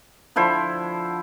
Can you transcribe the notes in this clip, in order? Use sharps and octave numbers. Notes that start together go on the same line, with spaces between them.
D3 F3 E4 C5